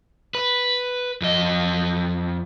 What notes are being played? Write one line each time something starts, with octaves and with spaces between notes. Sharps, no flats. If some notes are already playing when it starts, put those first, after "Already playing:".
B4
F2 D#5